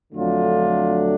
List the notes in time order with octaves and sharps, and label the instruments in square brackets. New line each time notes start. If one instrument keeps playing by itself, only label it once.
[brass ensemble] F2 D3 F#3 A3 D4 F4